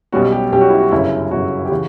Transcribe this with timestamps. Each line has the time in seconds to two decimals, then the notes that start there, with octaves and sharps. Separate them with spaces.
0.12 B1 B2 G3 C#4 F#4
0.32 G4
0.52 B1 B2 G3 C#4 G4
0.61 F#4
0.69 E4
0.78 F#4
0.91 G1 F#2 C#3 E4
1.31 G1 F#2 C#3 F#4
1.65 G4
1.70 C#3 E3 F#4